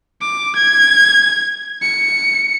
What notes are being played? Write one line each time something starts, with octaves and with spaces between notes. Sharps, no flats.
D6
G#6
C#7